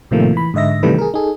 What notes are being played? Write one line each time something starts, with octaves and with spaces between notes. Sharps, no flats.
A2 C3 D#3 F3 A3 A#3
E3 B5
G#2 D3 D#5 E5 A#6
C3 D#3 E3 G3 A3 B4
G#4 A#4
D#4 G#4 A4